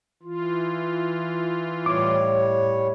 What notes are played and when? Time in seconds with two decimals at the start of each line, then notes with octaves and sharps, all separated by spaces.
0.23 E3 F4
1.86 A2 G3 C#5 D6